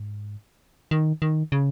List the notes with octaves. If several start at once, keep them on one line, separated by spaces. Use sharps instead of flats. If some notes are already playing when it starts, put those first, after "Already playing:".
Already playing: G#2
D#3
D#3
C#3